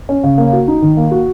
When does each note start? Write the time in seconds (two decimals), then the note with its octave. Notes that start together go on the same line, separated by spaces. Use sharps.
0.09 C#4
0.24 C#3
0.38 A#3
0.53 F#4
0.68 D#4
0.82 D#3
0.97 A#3
1.11 F#4